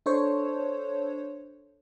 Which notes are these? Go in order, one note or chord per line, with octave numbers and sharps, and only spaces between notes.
D4 A4 C5 C#5